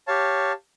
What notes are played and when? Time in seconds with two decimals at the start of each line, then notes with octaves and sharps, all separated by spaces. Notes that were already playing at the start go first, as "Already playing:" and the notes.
0.07 G4 C#5 F5 A5